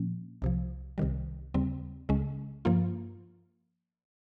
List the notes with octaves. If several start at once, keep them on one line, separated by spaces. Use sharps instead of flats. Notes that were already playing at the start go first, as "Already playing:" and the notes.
Already playing: A#2 F3 A#3 C#4
C2 C3 F3
C2 C3 D#3 G3
D#2 C#3 G3 C4
C#2 C#3 G#3 C#4
G2 F3 A#3 F4